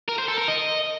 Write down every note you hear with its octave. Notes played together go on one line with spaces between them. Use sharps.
A#4
C5
A4
A#4
D#5